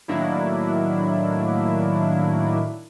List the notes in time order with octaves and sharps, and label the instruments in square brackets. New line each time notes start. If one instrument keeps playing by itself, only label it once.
[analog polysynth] A2 D#3 F#3 A#3 D4 E4